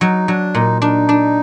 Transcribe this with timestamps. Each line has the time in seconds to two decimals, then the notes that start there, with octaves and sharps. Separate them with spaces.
0.01 F#3 D#4
0.28 F#3 D4
0.55 A#2 D#4
0.82 D4 D#4
1.09 D4